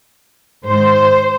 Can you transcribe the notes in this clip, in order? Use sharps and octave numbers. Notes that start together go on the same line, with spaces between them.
G#2 D#3 C5